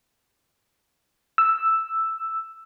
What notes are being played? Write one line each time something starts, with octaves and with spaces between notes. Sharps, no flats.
E6